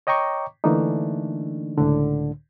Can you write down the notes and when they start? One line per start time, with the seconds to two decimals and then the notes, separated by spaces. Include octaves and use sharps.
0.07 C#5 D#5 G5 A#5 C#6 D6
0.64 D3 E3 A3 A#3 D4 D#4
1.78 C#2 A2 D3